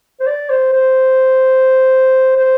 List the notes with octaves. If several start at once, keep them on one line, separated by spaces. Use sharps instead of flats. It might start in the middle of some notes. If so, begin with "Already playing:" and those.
C5
D5
C5
C5
C5